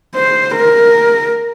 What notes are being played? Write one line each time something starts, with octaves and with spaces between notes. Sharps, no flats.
C5
A#4